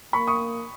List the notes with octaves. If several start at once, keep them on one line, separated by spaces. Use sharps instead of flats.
A#3 B5 C#6
C#6 D#6